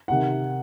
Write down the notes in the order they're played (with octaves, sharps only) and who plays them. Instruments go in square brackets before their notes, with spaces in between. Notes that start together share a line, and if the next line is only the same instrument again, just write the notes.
[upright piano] C3 D#3 F#5